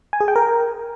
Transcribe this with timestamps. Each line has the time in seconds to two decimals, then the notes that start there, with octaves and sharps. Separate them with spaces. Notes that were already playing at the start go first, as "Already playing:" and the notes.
0.13 G#5
0.21 G#4
0.28 G5
0.36 A#4